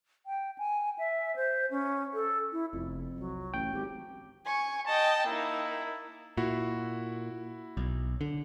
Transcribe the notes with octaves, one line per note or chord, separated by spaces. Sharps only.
G5
G#5
E5
C5
C#4
A4
E4
F1 F2 B3
C2 F#3
A1 G5
G#1 F#3 G4
G#5 C#6
D#5 G5 A5
A#3 D#4 E4
A#2 E4 F#4
B1
D3